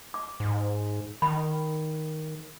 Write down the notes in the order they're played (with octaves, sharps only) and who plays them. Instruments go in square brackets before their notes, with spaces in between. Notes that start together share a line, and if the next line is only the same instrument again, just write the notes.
[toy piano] D6
[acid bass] G#2
[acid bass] D#3 [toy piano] B5